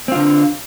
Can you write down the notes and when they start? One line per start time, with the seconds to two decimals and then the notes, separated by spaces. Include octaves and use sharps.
0.08 C4
0.12 F4
0.15 D3